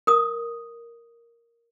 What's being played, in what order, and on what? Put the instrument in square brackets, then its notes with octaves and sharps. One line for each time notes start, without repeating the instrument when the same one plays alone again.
[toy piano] A#4 D#6